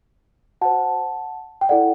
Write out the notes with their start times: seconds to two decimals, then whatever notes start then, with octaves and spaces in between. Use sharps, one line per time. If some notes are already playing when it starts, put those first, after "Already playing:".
0.61 F#4 C5 F#5 A5
1.61 G5
1.69 E4 A4 D5 F#5